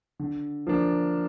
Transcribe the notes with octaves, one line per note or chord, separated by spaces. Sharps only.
D3
F3 A#3 D4